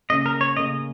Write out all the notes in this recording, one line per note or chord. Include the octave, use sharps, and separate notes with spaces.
C#3 A#3 C#4 D#5
A#4
C#5
C#3 A#3 C#4 D#5